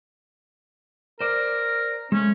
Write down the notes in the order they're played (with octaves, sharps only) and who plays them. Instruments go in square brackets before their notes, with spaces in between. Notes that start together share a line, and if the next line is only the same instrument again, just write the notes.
[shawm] A#4 [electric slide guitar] C5 D5
[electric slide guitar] G#3 A3 [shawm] C#4